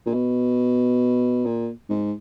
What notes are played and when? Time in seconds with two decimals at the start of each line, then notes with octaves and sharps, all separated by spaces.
0.06 A#2
0.14 B2
1.46 A#2
1.90 G#2